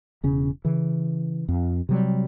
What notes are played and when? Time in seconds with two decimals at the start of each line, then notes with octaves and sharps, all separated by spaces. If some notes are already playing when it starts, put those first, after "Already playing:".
0.23 E1 C#3 C#4
0.65 C#3 E3
1.48 F2
1.89 C3 F#3 G3